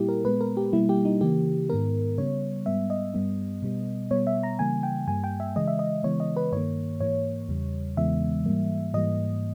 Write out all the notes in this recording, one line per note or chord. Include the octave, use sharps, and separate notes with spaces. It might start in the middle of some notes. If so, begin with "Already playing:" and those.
Already playing: A#2 G3 A#3 E4 G4
A#4
A#2 G#3 B3 B4
A#4
G4
B2 G3 A#3 E4
G4
D#4
C#3 E3 A#3 G4
G#2 D#3 G#3 B3 A#4
C#3 G3 B3 C#5
G#2 G3 B3 E5
D#5
G2 G3 B3
B2 G3 B3
B2 G3 B3 C#5
E5
A#5
C#3 E3 G3 A#3 G#5
G5
G2 G3 A#3 G#5
G5
E5
C#3 E3 G#3 D#5
E5
D#5
C#3 E3 G#3 B3 C#5
D#5
B4
G2 D#3 A#3 C#5
G#2 E3 A#3 C#5
E2 C#3 G3
E2 C#3 E3 G#3 B3 E5
G#2 E3 G3 A#3
G#2 E3 G3 A#3 D#5